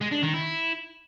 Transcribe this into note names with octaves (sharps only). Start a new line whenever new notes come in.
G#3
D4
D#3
E4